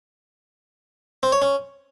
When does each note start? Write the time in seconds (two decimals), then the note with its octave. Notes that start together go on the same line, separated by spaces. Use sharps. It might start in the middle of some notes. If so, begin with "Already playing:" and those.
1.23 C4
1.32 C#5
1.42 C#4